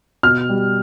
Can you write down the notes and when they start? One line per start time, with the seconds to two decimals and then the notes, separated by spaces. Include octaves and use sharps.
0.23 B2 F6
0.49 G3